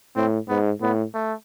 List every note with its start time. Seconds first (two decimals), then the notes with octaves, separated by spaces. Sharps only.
0.16 A2 C4
0.48 G#2 B3
0.81 A2 B3
1.14 A3